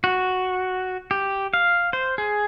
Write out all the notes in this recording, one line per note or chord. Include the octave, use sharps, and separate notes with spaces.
F#4
G4
F5
C5
G#4